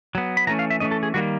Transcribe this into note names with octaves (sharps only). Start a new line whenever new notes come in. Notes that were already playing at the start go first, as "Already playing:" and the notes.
F#3 B3
B5
E3 A3 C#4 A#5
F5
E5
E3 A3 C#4 D#5
A4
G#4
D#3 G3 A#3 F#4